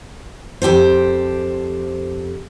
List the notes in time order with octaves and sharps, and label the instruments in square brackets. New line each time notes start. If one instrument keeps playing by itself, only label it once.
[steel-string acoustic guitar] F2 G4 A4 C5